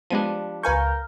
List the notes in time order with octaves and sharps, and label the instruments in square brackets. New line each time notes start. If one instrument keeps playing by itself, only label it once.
[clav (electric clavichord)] F3 G3 D4 [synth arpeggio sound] G#3 B3 D#7
[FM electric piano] C#2 F5 G6 [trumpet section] A#4 [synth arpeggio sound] B4 G#5 C#6